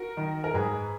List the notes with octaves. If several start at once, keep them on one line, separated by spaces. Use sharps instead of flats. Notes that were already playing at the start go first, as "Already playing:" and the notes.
Already playing: F#4 A#4
D#3
A#4
G#2 G#4 B4